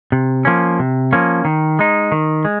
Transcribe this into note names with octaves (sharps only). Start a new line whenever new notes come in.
C3
F3 A#3 C#4
C3
F3 A#3 C#4
D#3
G#3 D#4
D#3
G#3